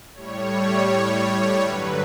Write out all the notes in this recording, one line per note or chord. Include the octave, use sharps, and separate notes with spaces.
A2 G3 C#5
G2 D3 F#3 B4